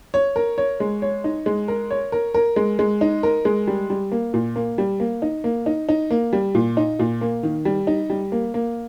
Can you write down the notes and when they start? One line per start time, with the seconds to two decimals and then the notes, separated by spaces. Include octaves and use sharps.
0.14 C#5
0.36 A#4
0.58 C#5
0.80 G#3
1.02 C#5
1.24 D#4
1.46 G#3
1.68 A#4
1.91 C#5
2.12 A#4
2.34 A#4
2.56 G#3
2.79 G#3
3.01 D#4
3.23 A#4
3.45 G#3
3.67 G3
3.90 G3
4.12 A#3
4.34 A#2
4.56 A#3
4.78 G3
5.00 A#3
5.22 D#4
5.44 A#3
5.66 D#4
5.89 D#4
6.11 A#3
6.33 G3
6.55 A#2
6.77 D#4
6.99 A#2
7.21 A#3
7.43 D#3
7.65 G3
7.87 D#4
8.10 G3
8.32 A#3
8.54 A#3